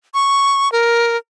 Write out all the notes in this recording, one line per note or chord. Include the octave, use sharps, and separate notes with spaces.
C#6
A#4